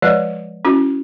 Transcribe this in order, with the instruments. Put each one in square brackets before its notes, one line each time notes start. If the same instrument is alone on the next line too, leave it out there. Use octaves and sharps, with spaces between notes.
[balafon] F3 G#3 B4 C#5 D5
C#4 E4 F#4